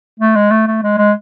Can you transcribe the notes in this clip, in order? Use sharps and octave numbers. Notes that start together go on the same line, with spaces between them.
A3
G#3
A3
A3
G#3
G#3